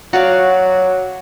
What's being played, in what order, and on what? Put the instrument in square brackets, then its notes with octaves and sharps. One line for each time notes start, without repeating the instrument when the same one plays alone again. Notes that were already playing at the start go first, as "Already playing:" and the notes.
[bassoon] F#3 [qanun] F#4 D5 F5